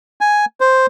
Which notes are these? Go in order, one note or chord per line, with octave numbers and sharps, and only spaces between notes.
G#5
C5